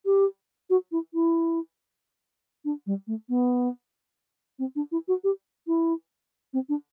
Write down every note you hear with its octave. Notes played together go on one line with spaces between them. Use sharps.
G4
F#4
E4
E4
D4
G3
A3
B3
C4
D4
E4
F#4
G4
E4
C4
D4